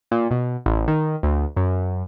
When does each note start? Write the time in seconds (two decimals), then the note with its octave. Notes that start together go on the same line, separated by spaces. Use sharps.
0.11 A#2
0.31 B2
0.66 A1
0.88 D#3
1.23 D2
1.57 F#2